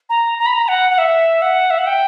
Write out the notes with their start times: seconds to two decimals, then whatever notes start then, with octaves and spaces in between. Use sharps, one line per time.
0.10 A#5
0.39 A#5
0.46 B5
0.53 A#5
0.68 F#5
0.90 F#5
0.98 E5
1.42 F#5
1.70 E5
1.78 F#5
1.87 G5